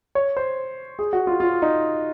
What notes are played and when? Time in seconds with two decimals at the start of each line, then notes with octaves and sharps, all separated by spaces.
0.15 C#5
0.37 C5
0.99 G#4
1.13 F#4
1.27 F4
1.40 F4
1.62 D#4